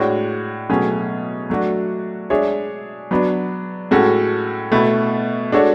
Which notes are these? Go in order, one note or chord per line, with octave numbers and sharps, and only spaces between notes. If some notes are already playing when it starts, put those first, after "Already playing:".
Already playing: A2 G#3 D4 F#4 C#5
B2 F#3 A3 C#4 G#4
F#3 A3 D4 F#4
G#3 D4 G#4 C#5 E5
F#3 B3 D4
A2 G#3 C#4 F#4 A4
B2 A3 E4
G#3 D4 F#4 A4 C#5